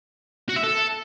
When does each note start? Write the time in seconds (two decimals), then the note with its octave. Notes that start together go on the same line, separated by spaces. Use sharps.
0.49 F#4
0.56 E5
0.64 A4